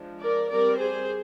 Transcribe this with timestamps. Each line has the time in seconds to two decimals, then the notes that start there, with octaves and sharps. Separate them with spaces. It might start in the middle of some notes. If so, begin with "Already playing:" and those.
Already playing: F3 G#3 D4
0.20 A#4 D5
0.49 G3 C4 A#4 D5
0.78 G#4 C5